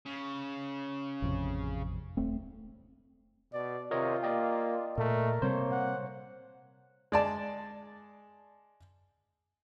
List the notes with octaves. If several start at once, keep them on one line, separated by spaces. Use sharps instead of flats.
C#3
A1 F2 C3
D#1 A3 C4
B2 D5
C3 F4 A#4 C#5 D#5
A#3 D5 D#5 G5
A#2 A3 A#4
C3 G3 A#3 C4 C5 C#5
F#5
G#3 D5 A5